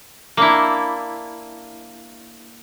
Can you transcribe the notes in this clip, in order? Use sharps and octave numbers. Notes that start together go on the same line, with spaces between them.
A#3 D4 E4